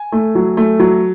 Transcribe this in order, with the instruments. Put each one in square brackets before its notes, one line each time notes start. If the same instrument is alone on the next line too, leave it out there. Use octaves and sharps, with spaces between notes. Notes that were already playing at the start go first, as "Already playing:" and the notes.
Already playing: [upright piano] G#5
A3
F#3
A3
F#3